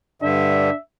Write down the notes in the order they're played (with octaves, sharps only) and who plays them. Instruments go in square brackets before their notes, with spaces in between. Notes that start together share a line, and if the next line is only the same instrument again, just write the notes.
[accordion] G2 D3 [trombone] D4 [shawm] E5